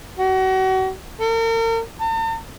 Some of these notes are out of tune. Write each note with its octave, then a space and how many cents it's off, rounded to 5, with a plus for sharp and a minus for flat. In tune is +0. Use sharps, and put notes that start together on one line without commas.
F#4 +35
A#4 -40
A5 +45